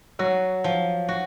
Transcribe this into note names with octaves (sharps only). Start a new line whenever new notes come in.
F#3 F#4
F3
F#4